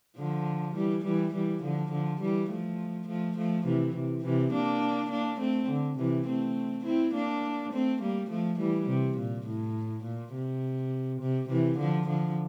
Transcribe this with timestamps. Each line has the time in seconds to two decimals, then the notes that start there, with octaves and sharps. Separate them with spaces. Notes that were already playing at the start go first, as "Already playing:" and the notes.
0.17 D3 F3
0.76 E3 G3
1.04 E3 G3
1.34 E3 G3
1.62 D3 F3
1.91 D3 F3
2.21 E3 G3
2.50 F3 A3
3.08 F3 A3
3.37 F3 A3
3.66 C3 E3
3.95 C3
4.24 C3 E3
4.53 A#3 D4
5.11 A#3 D4
5.40 A3 C4
5.70 D3
5.98 C3 E3
6.27 A3 C4
6.85 C4 E4
7.14 A#3 D4
7.72 A3 C4
8.01 G3 A#3
8.30 F3 A3
8.59 E3 G3
8.89 C3
9.18 A#2
9.46 A2
10.04 A#2
10.34 C3
11.21 C3
11.49 C3 E3
11.78 D3 F3
12.08 D3 F3